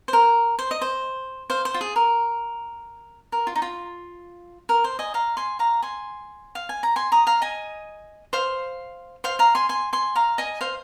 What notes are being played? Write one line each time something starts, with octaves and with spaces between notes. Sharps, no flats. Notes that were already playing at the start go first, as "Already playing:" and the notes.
C5
A#4
C5
D#5
C5
C5 F5
C5
F4
G#4
A#4
A#4
F4
D#4
F4
A#4
C5
D#5 G#5
F5 A#5
G#5 C6
F5 A#5
G#5 C6
F5
G#5
A#5
G#5 C6
A#5 D#6
F5 A#5
D#5 G#5
C5 F5
C5 F5
F5 A#5
G#5 C6
G#5 C6
G#5 C6
F5 A#5
D#5 G#5
C5 F5